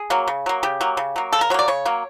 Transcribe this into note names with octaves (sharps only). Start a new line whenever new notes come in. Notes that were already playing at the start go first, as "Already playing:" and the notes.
Already playing: G#4
F#3 A#3
C#3
F#3 A#3
C#3 G4
F#3 A#3
C#3
F#3 A#3
C#3 A4
A#4
F#3 A#3 C#5 D5
C#3 C#5
F#3 A#3